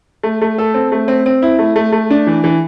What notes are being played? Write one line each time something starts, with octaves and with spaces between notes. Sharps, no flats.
A3
A3
A4
C4
A3
C4
C4
E4
A3
A3
A3
D4
E3
E3